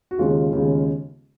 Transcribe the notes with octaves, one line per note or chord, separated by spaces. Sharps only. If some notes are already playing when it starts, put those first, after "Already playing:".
F#4
D#2 C#3 G#3 B3 F4
D#2 C#3 G#3 B3